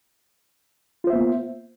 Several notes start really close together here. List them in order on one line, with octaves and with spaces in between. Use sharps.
F4 C5 E5 B3 A#3